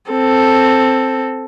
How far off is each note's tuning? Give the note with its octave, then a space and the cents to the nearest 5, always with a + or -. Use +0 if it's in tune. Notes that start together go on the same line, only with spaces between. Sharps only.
C4 +0 A4 +0